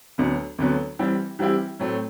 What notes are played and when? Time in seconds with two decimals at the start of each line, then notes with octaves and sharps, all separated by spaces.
0.18 D2 D3 F#3 B3
0.58 D2 D3 F#3 B3
0.99 E3 G3 C4 E4 G4
1.39 E3 G3 C4 E4 G4
1.80 A2 F#3 A3 C4